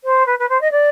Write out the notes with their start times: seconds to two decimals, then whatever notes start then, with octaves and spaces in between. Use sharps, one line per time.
0.04 C5
0.26 B4
0.39 B4
0.49 C5
0.61 D#5
0.71 D5